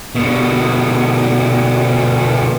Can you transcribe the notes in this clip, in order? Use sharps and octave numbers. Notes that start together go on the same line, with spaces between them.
B2 D3